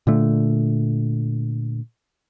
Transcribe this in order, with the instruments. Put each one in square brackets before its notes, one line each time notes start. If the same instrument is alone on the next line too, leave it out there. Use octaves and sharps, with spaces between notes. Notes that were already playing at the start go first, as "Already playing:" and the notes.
[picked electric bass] A#2 D3 A3